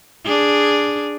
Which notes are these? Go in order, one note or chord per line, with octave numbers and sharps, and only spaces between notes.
D4 G#4